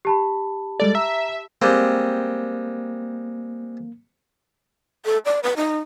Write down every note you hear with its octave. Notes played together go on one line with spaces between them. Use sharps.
G4 A5 B5
G3 G#3 A4 D5
E5 A#5 E6
G3 G#3 A#3 C4
A4
D5
B4
D#4